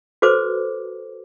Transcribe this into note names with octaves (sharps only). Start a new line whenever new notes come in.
F#4 A4 B4 C5 D6